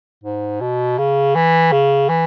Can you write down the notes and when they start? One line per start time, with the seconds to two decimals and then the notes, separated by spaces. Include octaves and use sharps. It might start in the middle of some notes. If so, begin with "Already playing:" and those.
0.24 G#2
0.61 B2
0.98 C#3
1.35 E3
1.72 C#3
2.09 E3